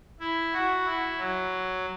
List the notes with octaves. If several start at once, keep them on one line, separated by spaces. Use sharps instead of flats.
E4
F#4
E4
F#3